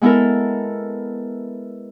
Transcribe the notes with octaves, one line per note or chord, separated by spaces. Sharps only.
G#3 B3 E4 A4 A#4